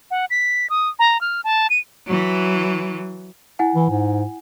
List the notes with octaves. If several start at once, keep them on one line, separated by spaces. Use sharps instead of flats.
F#5
B6
D#6
A#5
F6
A5
D#7
E3 F#3
E4 F#5 G#5
E3
G#2